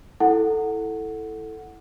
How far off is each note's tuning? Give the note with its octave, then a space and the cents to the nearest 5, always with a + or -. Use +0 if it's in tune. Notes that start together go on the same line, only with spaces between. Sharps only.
E4 +0 A4 +0 F#5 +0